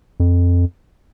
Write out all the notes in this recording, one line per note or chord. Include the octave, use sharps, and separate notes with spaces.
F2